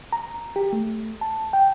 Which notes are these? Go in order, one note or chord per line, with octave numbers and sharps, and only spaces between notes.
A#5
G4
A3
A5
G5